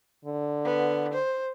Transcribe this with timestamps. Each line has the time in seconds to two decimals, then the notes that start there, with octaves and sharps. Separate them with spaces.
0.25 D3
0.65 B3
1.13 C5